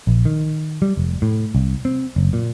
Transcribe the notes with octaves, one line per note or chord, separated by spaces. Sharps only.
A#1
D#3
G3
F1
A2
C2
C4
F#1
A#2